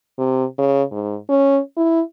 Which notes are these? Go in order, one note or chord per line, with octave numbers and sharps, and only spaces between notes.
C3
C#3
G#2
C#4
E4